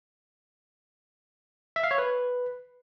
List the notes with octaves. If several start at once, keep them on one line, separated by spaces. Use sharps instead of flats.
E5
F5
C#5
B4